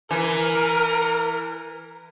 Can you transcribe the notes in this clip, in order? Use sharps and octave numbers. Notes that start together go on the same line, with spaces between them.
E3 A#4